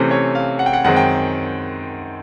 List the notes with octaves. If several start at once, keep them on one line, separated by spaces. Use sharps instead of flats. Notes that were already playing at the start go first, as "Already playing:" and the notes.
Already playing: C3 E3 A3 C#4 C5
C#5
F5
F#5
G5
F#5
F#2 D#3 G#3 C4 F#5
G5